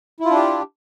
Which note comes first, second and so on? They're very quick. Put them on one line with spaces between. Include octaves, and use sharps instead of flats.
E4 F4 D4 G4